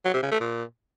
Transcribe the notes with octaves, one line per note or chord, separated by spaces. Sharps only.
F#3
C3
C#3
A3
A#2